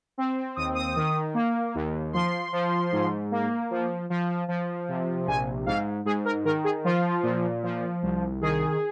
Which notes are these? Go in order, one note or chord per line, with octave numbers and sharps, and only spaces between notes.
C4
D#2 D#6
D#6
D#3
A#3
D#2
F3 C6
F3
G#2
A#3
F3
F3
F3
C3
A#1 G#5
G#2 F5
G#2 G#4
A#4
D#3 A#4
G#4
F3 F4
A#2
F3
C2
D#3 G#4